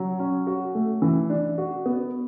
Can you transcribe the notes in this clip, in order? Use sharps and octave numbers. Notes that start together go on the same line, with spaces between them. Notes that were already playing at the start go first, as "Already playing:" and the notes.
Already playing: F#3
C#4
F#4
A3
E3
D4
F#4
B3